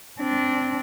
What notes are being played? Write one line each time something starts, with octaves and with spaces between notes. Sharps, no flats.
C4 D4